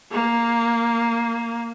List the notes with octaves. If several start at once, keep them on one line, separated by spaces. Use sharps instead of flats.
A#3